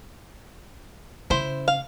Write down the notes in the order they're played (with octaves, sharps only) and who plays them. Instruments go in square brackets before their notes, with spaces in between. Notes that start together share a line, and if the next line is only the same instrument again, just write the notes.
[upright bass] C#3 [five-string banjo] E4 C5
[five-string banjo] F5